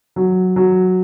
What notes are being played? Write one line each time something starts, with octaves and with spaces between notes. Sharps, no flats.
F#3
F#3